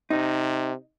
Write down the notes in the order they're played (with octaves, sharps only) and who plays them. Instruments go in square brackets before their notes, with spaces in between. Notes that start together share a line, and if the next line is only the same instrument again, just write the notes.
[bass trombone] C3 [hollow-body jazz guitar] D#4